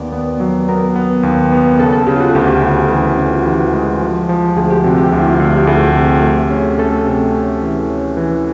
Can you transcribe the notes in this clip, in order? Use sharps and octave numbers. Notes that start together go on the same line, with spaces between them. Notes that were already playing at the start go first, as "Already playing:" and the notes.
Already playing: D#2 B3 D5
B3
F#3
B3 A#4
B3
D#2
B3
C#3 A4
A4
C#3 G4
F4
F#4
D2 G4
C#3
E3
C#3
F4
F#4
E3 G4
G#3
F3
F3
D2 G#4
G4
C3 F#4
G4
D2
E4
F4
D2 F#4
G4
D2 G#4
C3
A3
C#4
A3 A4
C3
C#4
E3
C#4
E3